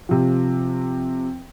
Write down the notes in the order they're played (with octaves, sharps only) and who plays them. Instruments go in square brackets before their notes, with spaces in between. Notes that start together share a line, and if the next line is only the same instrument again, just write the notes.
[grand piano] C3 F3